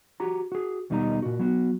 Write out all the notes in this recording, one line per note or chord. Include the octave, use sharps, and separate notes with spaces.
F#4 G4 A#5
F#4 G#4
D#2 B2 G3 D#4 D#5 A#5
A#2 F#4
F#3 B3 F#4